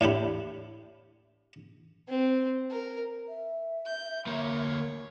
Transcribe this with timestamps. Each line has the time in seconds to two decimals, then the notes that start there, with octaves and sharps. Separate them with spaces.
0.01 A2 D4 G4 B5
2.09 C4
2.71 A#4
3.28 E5
3.86 G6
4.27 D2 A#3 C#5